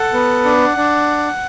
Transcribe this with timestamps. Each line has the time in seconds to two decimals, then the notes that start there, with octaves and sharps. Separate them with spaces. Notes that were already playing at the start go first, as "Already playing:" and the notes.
Already playing: A4 F#5
0.13 B3
0.45 D4
0.77 D4